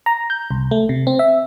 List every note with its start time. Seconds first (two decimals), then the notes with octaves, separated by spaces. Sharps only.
0.06 A#5
0.30 G6
0.51 C2
0.71 A3
0.89 C3
1.07 C4
1.19 E5